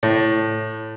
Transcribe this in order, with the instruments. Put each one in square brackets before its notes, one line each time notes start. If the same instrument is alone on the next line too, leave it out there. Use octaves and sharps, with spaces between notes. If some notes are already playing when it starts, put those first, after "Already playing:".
[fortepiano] A2